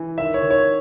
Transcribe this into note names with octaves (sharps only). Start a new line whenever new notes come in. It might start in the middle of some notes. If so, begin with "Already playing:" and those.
Already playing: E3
D#3 E5
C#5
D#3
C#5